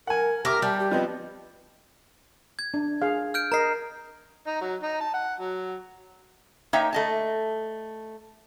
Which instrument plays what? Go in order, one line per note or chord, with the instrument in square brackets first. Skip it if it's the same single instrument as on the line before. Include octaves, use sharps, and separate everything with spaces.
[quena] A#4 [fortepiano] F#5 G#5
[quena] G4 [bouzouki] A#4 [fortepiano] E5 D6 F6
[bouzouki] G3 [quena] A5
[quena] G4
[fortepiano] F3 B3 C4 [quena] D#5
[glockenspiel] G#6
[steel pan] D4
G#4 F5
[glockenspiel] F6 G6 D7
[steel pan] A#4 D#5 [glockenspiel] A#5 C7
[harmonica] D#4
F#3
D#4
A5
F#5
F#3
[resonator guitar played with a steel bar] A#3 D#4 C#5 D#5 E5 G5
A3 D#5 A5